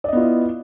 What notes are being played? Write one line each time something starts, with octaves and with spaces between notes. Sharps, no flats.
B3 E4 F4 D5 D#5